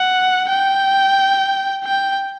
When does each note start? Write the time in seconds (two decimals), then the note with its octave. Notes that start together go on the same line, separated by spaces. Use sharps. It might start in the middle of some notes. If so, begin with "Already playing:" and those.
Already playing: F#5
0.50 G5
1.85 G5